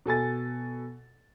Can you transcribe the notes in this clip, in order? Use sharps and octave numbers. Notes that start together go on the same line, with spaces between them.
B2 A4 G#5 A6